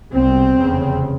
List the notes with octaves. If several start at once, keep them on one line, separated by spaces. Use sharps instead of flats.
C2 B2 C4
F1 E2 C#3